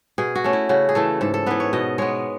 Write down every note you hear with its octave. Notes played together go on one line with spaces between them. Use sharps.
B2 G#4
F#4
A3 C#4
E4
C#3 F#4
G#4
E3 A3 A4
G#2 A4
A4
E3 B3 B4
C#5
B2 D#5
G#3 B3 C#5